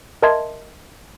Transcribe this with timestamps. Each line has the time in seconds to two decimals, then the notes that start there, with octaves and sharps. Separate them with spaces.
0.22 A#4 D#5 E5 A5 C6 G#6